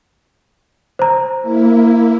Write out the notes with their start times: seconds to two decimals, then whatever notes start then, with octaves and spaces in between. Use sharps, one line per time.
0.99 C5 A#5
1.41 A#3 E4